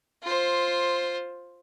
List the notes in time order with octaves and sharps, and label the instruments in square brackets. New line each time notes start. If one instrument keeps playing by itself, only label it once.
[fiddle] F4 C5